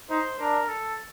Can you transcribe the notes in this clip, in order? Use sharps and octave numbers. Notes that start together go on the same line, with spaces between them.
D#4 C5
D4 A#4
A4